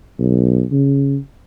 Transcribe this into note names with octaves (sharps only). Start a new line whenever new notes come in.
B1
C#3